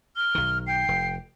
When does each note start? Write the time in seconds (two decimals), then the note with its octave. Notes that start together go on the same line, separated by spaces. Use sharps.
0.16 F6 G7
0.35 B1 D#3
0.67 G5 C7
0.88 F1